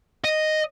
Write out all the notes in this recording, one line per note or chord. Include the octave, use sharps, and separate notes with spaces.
D#5